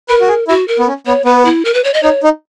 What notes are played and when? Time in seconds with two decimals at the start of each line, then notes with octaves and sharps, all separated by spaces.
0.09 A#4 B4
0.21 F#4
0.28 G#4
0.48 E4 F#4
0.68 A#4
0.79 B3
0.88 C#4
1.06 B3 C#5
1.25 B3 B4
1.45 E4
1.65 A#4
1.74 B4
1.84 C#5
1.94 D#5
2.03 D#4 C#5
2.23 D#4